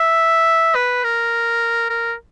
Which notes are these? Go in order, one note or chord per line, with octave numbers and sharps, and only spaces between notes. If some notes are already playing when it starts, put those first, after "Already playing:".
Already playing: E5
B4
A#4
A#4